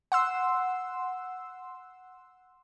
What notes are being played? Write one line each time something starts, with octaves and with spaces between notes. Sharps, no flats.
F#5 C6 E6